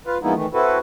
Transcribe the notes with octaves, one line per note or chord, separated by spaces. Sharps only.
F4 B4 F5
F3 G#3 A#3 B3 D#4 E4
D#3 E3 A3
C4 E4 F#4 A4 B4